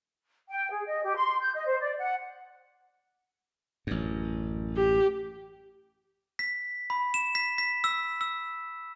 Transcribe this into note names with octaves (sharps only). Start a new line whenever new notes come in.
G5
G#4
D#5
G4
C6
G6
D#5
C5
D5
F#5
A1 F#2
G4
B6
B5
E7
B6
B6
E6
E6